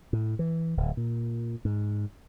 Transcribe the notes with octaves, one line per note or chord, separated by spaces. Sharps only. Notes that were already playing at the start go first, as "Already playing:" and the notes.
A2
E3
D1
A#2
G#2